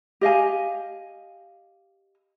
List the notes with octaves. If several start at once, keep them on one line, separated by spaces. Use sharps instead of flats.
G4 D#5 F5 G#5